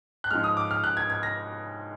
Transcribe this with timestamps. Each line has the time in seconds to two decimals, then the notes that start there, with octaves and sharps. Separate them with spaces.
0.24 F#6
0.31 G#2 F3 G#3 F6
0.44 D#6
0.57 D6
0.71 F6
0.84 F#6
0.97 G#6
1.10 G#6
1.23 A#6